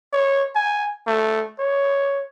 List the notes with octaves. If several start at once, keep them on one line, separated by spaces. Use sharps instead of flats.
C#5
G#5
A3
C#5